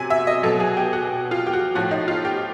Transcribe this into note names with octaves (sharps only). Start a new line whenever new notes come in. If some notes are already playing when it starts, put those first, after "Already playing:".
Already playing: C3 F#3 G#5
E5
D#5
B2 F#3 A4
G#4
G4
F#4
F4
G4
F#4
A2 F3 F#4
D#4
F4
G4